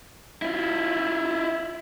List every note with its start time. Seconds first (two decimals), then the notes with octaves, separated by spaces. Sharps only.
0.42 E4 F4